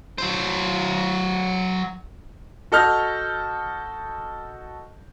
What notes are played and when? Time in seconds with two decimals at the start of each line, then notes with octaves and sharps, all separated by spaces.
0.18 F#3 C5
2.72 F#4 A4 D#5 F6 G6 A#6